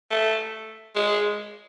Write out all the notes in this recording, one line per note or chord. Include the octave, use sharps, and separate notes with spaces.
A3
G#3